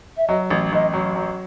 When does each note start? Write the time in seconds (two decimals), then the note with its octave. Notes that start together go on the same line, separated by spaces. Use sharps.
0.17 E5
0.27 F#3 D#5
0.51 A1
0.72 A1 D#5
0.93 F#3
1.16 F#3